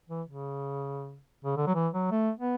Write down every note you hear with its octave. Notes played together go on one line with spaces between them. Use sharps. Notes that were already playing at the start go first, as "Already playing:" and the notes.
E3
C#3
C#3
D3
F#3
E3
F#3
A3
B3